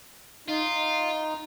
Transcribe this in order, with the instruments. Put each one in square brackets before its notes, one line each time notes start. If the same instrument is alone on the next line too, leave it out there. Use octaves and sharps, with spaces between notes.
[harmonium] D#4 [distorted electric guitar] F4